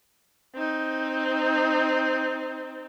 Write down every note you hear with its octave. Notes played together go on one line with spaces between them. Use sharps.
C4 D#4